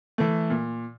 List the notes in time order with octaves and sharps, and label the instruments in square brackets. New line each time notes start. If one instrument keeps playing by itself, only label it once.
[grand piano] E3 A3
A#2